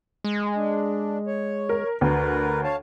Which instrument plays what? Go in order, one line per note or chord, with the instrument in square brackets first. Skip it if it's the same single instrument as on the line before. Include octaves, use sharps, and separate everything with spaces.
[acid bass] G#3
[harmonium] D4
C#5
[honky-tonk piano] A#4
[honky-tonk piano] D2 [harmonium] A#4 B4
[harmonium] C#5 F5 A5